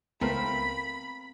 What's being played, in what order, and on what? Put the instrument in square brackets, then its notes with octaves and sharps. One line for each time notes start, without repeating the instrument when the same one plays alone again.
[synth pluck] C#2 A3 B3 [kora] C4 A#4 F5 [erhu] B5